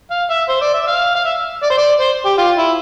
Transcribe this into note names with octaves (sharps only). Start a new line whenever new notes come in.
F5
E5
C5
D5
E5
F5
F5
E5
D5
C5
D5
C5
G4
F4
E4